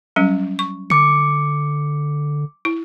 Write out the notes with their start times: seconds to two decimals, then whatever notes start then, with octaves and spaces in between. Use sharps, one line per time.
0.16 F#3 G3 C#4
0.59 C#6
0.90 D3 D6 C#7
2.65 E4